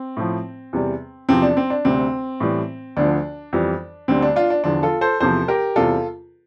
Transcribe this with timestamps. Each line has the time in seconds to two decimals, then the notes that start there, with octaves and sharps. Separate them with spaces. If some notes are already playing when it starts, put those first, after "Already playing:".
Already playing: C4
0.17 A2 F3
0.73 E2 C3 G3
1.29 E2 C3 F3 C4
1.42 D4
1.57 C4
1.70 D4
1.85 D2 C3 G3 C4
2.40 A2 E3 G3
2.97 D2 D3 F3 D4
3.53 F2 E3 G3
4.08 D2 D3 G3 C4
4.22 D4
4.36 D4 F4
4.50 D4
4.64 E2 D3 F3 D4
4.83 F4 A4
5.01 A4 C5
5.20 E2 C3 F3 A4 C5
5.48 G4 A#4
5.76 E2 C3 G3 F4 A4